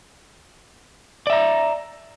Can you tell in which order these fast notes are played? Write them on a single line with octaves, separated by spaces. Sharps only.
D5 E5 A#5